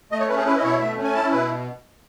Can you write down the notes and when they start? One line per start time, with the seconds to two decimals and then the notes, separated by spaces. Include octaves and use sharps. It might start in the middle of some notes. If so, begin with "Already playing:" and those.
0.12 A3 D#5
0.20 C#5
0.28 C#4 B4
0.37 G#4
0.46 E4 B4
0.58 D#5
0.63 B2 C#5
0.80 A3 E5
0.97 C#4
1.04 G#5
1.14 E4 A5
1.32 B2 B4